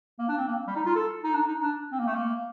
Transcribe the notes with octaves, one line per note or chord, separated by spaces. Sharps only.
A#3
D4
C4
A#3
G3
D#4
F4
A4
D#4
D4
D#4
D4
C4
A#3
A3
A#3